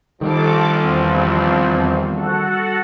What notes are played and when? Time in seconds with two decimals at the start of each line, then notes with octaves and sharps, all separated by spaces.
0.21 A#1 D#3 F3 G3 G4 A4 F5 D6
0.80 E2 C4
2.14 F#4 A4 F#5